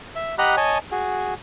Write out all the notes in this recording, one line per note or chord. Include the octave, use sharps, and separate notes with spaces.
E5
G4 D#5 F#5 A#5 B5 F#6
C#5 D#5 G#5 A5
F#4 G#4